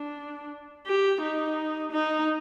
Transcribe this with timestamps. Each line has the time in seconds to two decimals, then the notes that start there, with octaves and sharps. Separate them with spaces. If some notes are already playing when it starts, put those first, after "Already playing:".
Already playing: D4
0.86 G4
1.22 D#4
1.91 D#4